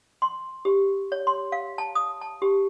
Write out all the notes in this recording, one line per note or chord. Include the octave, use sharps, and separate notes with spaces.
C6
G4
C#5
C6
F5
A5
D#6
A5
G4